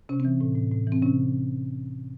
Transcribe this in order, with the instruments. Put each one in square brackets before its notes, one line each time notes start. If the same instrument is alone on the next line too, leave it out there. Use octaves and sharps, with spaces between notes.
[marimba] C3 C#4
C4
E3
A2
A2
A2
E3
C4
C3 C#4